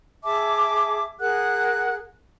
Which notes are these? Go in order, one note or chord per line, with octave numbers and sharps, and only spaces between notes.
G#4 E5 A5 D6
G#4 A#4 F#5 F#6